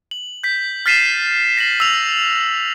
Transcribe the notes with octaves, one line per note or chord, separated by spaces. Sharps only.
F#7
G6 B6
F6 A6 B6 C7 D#7 E7
A#6 C7 F#7
E6 F7